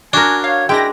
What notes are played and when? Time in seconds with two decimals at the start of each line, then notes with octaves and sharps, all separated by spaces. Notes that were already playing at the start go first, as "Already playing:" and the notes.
0.13 D4 F#4 A#4 G#5
0.44 C#5 F5
0.69 G#3 D4 E4 G5 A#6